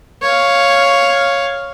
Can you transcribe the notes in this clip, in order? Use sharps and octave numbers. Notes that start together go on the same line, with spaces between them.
C#5 F5